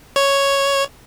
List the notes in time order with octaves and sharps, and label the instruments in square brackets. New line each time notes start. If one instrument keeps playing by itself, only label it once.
[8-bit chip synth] C#5